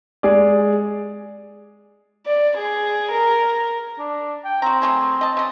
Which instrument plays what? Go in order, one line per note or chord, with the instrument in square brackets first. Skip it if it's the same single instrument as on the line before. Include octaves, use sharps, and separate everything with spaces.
[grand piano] G#3 G#4 D5
[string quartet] D5
G#4
A#4
[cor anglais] D4
G5
[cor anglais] C4 [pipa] F#4 A#5
[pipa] F#3 A3 G#4
D#5 A5
C#3 D#5